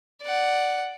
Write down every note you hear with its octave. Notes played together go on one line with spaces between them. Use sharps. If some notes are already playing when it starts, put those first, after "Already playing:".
D5 F#5